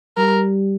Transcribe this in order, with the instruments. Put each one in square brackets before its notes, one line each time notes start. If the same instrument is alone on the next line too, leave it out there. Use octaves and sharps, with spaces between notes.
[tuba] G3 [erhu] A#4